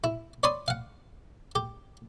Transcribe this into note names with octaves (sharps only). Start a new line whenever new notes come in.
E4
C#5 D5 B5 C6 D#6
F5 F#5
G4